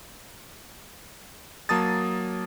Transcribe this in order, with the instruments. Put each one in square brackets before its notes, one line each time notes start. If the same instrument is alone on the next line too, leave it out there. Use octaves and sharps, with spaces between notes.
[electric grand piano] F#3 A#3 A5 D#6 A6